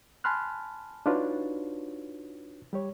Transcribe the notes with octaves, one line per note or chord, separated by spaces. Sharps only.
G#5 A5 B5 C6 F6 F#6
D4 D#4 F4 F#4 B4 C#5
G3 G4 C#5